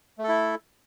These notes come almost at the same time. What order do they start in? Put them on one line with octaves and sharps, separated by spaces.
A3 A4 E4